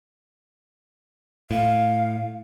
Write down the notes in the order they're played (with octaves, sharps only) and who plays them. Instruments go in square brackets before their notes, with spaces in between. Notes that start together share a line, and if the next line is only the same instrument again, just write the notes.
[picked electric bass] A2 [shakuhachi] F5